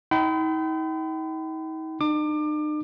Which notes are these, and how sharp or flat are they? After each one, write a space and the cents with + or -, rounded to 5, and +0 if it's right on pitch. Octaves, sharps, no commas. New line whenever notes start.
D#4 +40 G5 -35 B5 +40
D#4 -45 D6 +30